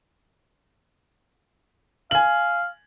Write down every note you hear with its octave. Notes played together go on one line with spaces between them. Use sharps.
F5 G#5 F#7